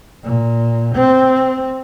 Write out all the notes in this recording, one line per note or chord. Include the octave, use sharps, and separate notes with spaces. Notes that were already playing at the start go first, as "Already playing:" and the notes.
A#2
C4